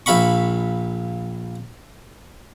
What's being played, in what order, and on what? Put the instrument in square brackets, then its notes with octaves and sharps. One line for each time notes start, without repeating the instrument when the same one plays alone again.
[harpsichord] A#1 E5 F5 B5 C#6